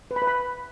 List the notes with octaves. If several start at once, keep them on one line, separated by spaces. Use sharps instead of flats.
B4
B5
B4
B5